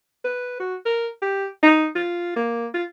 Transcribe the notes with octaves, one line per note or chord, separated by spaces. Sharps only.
B4
F#4
A#4
G4
D#4
F4
A#3
F4